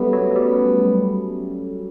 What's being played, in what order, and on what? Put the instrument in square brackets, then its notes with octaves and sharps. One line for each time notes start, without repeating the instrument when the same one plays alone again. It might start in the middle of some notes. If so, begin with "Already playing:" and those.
Already playing: [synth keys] G3 A3 C#4 [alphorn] B3
[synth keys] F#3
F#3
G3